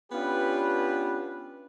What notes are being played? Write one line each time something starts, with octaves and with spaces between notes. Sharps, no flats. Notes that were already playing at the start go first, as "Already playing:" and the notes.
B3 C#4 D4 F4 G4 B4